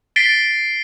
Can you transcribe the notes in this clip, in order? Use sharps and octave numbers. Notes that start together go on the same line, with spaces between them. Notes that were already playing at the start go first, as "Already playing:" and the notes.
A6 B6 C7 D7 G7